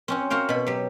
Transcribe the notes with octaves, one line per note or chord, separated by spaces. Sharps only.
C4 C#4 F#4
F#4 A#4 C5 F5 G5
B2 B5
F#3 G4